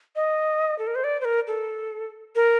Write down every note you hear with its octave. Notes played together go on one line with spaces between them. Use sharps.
D#5
A4
A#4
C5
D5
C5
A#4
A4
A#4